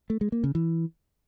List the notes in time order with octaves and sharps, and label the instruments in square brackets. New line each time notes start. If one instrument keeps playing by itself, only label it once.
[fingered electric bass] A3
G#3
A#3
C#3
E3